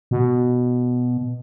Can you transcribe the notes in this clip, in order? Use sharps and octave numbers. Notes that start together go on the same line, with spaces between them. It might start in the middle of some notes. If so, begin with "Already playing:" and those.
B2